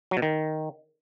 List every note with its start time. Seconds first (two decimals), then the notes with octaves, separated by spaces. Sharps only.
0.11 F#3
0.17 B2
0.22 D#3